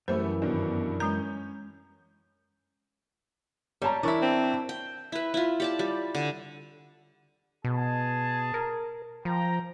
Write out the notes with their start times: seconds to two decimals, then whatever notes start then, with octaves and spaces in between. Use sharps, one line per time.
0.08 F#2 E3 G3 A3 C5
0.42 G2 B2 D#3
1.00 G#3 C#4 A#5 G6
3.82 G3 C#5 A5 A#5
4.03 E3 D4 E4 A#4 C#6
4.22 C4
4.69 G5
5.12 E4 B4
5.34 E4 F4
5.60 G4 D5 A5
5.79 G3
6.15 D3
7.65 B2 G#4 A5
8.54 A#4
9.25 F3 G5 A#5